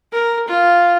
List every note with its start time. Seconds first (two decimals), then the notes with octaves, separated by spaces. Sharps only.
0.12 A#4
0.47 F4